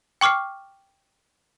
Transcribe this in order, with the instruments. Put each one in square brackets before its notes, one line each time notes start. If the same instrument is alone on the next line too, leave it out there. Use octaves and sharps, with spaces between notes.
[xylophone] G5 C#6 D6 F6 C7